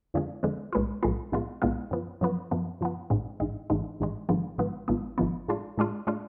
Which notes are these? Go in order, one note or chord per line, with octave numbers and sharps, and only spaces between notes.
F2 D3 F3 G#3
F2 D3 F3 G#3
B1 A2 G#3 B3 F4
B1 A2 G#3 B3 F4
B1 A2 G#3 B3 F4
B1 A2 G#3 B3 F4
F#2 F3 B3
F#2 F3 B3
F#2 F3 B3
F#2 F3 B3
A1 G#2 G#3
A1 G#2 G#3
A1 G#2 G#3
A1 G#2 G#3
G#1 G#2 F3 B3
G#1 G#2 F3 B3
G#1 G#2 F3 B3
G#1 G#2 F3 B3
A2 G#3 D4 F4
A2 G#3 D4 F4
A2 G#3 D4 F4